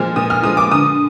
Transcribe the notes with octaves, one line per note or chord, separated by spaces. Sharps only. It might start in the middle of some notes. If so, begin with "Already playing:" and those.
Already playing: A#2 F3 G#3 F6
A#2 D#6
F6
F3 G#3 D#6
D6
D3 D#6